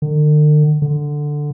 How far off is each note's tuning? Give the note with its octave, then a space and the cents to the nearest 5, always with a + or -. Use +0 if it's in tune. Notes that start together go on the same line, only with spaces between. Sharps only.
D3 +45
D3 +5